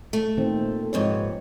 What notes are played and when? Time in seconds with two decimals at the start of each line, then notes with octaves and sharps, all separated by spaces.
0.13 A3
0.37 A#2 D#3 C4
0.93 G#2 C3 F3 C4 B4 C#5